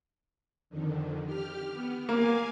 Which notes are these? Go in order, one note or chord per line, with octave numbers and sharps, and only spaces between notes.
F2 D3 D#3
G4 F6
B3
A#3 F5 G#5